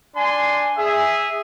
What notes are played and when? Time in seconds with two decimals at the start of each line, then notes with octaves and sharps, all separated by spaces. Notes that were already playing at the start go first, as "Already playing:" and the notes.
0.16 D4 G#5 C6
0.77 G#4 E5